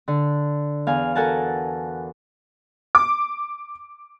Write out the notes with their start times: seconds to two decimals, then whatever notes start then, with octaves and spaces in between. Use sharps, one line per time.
0.08 D3
0.87 E2 F5 G#5
1.15 F#4 A4 A#4 F#5 G#5 A5
2.95 D6